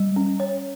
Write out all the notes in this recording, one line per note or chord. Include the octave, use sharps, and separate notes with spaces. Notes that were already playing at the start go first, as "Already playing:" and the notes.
Already playing: G3
C#4
C#5